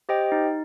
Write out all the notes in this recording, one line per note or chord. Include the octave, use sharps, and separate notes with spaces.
G4 C5 D#5 G5
D#4